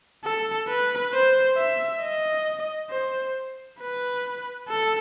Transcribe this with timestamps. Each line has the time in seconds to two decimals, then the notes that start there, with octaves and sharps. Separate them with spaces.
0.24 A4
0.69 B4
1.13 C5
1.58 E5
2.02 D#5
2.90 C5
3.80 B4
4.69 A4